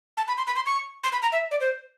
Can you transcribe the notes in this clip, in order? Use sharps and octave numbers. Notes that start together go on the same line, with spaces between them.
A5
B5
C6
B5
C6
C#6
C6
B5
A#5
E5
D5
C5